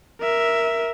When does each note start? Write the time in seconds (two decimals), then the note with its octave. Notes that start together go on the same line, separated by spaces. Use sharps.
0.21 A#4 E5